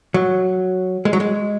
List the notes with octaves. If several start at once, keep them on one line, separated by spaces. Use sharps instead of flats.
F#3
G#3
F#3
G#3